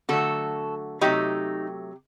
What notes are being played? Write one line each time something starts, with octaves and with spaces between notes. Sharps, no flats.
D3 F#3 A3 F#4 A4
C3 F#3 A3 D#4 G4